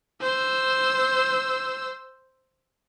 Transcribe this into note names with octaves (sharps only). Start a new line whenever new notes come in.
C5 E6